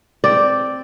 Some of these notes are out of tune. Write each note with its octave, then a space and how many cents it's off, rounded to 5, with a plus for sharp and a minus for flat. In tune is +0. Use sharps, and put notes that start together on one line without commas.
C4 +0 D5 +0